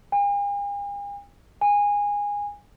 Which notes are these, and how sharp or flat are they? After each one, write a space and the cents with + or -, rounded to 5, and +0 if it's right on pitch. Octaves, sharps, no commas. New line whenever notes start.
G#5 -45
G#5 -20